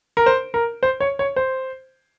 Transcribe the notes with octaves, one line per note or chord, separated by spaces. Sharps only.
A#4
C5
A#4
C5
C#5
C#5
C5